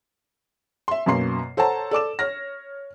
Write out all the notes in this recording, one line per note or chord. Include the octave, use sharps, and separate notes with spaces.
E5 C6
F#2 B2 A#3 C6 C7
A4 C5 C#5 F#5 A5 A#5
A4 D5 D6 E7
C#5 F6 A#6